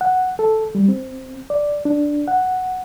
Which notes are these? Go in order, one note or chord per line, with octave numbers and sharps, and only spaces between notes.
F#5
A4
G3
C4
D5
D4
F#5